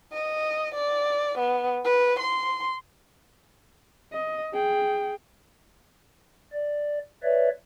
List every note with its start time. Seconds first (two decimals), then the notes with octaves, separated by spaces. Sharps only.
0.13 D#5
0.75 D5
1.38 B3
1.85 B4
2.20 C6
4.13 D#5
4.53 G#4 G5
6.53 D5
7.23 B4 C#5 D5 E5